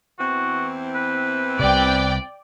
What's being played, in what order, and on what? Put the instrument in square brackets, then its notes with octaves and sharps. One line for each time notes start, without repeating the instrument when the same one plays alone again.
[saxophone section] E2 E3 C4 [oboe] F#4
[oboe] B4
[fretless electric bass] C2 C3 [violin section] D5 G5